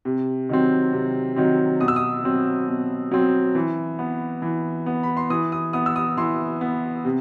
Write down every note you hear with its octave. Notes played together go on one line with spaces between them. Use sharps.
C3
D#3 F#3 C4
C3
D#3 F#3 C4
B2 D#6
E6
D#6
F#3 C4
B2
F#3 C4
E3
B3
E3
B3
B5
C6
E3 D#6
D#6
B3 D#6
E6
D#6
E3 C6
B3
C3